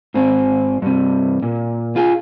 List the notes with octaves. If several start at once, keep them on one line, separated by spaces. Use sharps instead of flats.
G#2 C4
G2 C3
A#2
F4 G#4